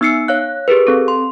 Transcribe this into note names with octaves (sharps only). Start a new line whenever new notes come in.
B3 D#4 E6 C7 C#7
C#5 F5 F#6
G4 G#4 A#4 B4
C4 A4
C6